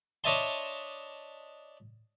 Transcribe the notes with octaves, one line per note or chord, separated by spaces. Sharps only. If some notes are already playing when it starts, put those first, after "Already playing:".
D4 C#5 D#5 E5 A5 C6